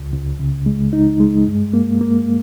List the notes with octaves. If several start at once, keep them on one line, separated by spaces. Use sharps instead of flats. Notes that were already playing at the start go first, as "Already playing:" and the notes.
Already playing: C#2
C#2
C#3
G#3
D#4
G#3
G2
A#3
A#3